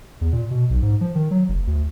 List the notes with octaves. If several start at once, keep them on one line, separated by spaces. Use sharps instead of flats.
E2
A#2
B2
B1
G#2
F3
D#3
F#3
F#1
D2